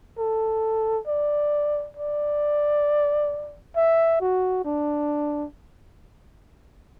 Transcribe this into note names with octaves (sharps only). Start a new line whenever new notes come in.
A4
D5
D5
E5
F#4
D4